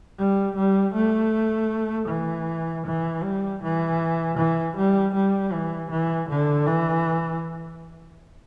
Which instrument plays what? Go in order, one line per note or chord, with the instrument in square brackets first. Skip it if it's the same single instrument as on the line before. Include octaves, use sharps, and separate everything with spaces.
[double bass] G3
G3
A3
E3
E3
G3
E3
E3
G3
G3
E3
E3
D3
E3